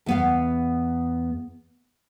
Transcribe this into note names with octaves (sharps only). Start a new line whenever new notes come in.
E2 B3 F5